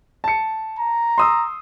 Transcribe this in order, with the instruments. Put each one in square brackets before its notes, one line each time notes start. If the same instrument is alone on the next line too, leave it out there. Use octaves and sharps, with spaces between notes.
[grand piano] A5 C#7
[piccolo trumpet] A#5
[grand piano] C6 D#6 E6